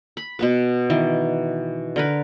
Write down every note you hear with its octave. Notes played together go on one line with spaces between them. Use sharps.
B5
B2 B3 B4
D#3 E3
D3 A#4 B4